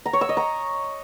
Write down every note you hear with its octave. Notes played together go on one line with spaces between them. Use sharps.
A#5
C#5
E6
D#5
A#5